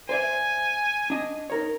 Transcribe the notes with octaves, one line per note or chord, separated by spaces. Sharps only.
C5 D5 E5 G#5
D4 D#5
D#4 A#4 C#5